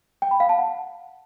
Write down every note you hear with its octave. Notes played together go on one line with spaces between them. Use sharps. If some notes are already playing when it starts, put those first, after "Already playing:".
G5
B5
F5
A5
F#5